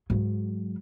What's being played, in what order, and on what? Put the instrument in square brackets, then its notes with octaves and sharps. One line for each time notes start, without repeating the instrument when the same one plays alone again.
[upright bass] G#2 F#3